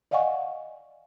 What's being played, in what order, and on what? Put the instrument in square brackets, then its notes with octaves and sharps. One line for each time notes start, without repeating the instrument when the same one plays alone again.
[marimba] D5 D#5 F5 F#5 G#5 C#6